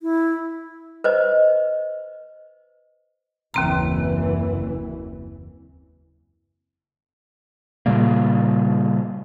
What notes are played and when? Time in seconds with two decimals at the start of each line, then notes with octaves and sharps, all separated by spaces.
0.01 E4
1.04 B4 C5 D#5
3.54 F#1 D#2 E3 C4 A#5
7.86 A#2 C#3 G3 A#3